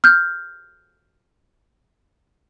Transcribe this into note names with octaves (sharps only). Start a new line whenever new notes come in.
F6 G6